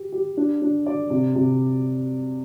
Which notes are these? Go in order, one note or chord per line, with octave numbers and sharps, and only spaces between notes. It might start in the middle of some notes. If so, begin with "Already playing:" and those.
Already playing: G4
G4
D4
D4
D5
C3
C3